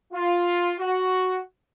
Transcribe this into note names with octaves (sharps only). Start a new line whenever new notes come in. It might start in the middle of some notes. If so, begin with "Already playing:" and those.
F4
F#4